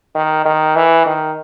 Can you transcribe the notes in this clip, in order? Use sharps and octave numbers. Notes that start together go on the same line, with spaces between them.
D#3
D#3
E3
D#3